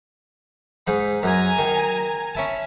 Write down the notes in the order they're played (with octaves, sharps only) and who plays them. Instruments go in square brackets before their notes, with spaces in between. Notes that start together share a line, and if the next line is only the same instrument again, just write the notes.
[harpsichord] G#2 D#4 B5
[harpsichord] F#2 [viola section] G#5 A#5
[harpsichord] D#3
C#4 E4 A5